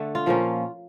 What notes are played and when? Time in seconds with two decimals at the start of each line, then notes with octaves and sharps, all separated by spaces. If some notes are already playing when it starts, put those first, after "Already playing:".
Already playing: D3 A3 D4
0.15 F4
0.26 A#2 F3 A#3 C#4